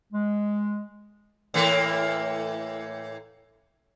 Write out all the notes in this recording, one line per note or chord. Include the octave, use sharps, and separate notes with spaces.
G#3
A2 E3 A#3